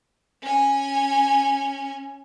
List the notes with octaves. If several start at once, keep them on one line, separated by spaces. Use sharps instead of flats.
C#4 G#5